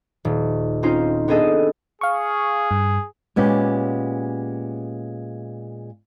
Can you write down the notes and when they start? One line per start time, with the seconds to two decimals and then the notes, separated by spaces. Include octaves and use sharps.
0.25 D#1
0.83 C4 C#4 D#4 F4 C5
1.28 B3 C4 D4 G#4 A4 D#5
2.01 G#4 F5 C#6
2.71 G2
3.36 A#2 G#3 B3 C#4 G4